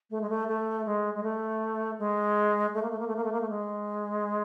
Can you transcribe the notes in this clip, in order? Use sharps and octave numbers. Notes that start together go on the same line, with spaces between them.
A3
G#3
A3
A3
G#3
G#3
A3
G#3
A3
A#3
A3
A#3
A3
A#3
A3
A#3
A3
G#3